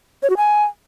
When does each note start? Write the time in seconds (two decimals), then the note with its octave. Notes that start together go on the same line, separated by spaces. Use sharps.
0.23 C#5
0.30 F#4
0.37 G#5